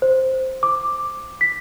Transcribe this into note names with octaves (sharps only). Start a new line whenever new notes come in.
C5
D6
B6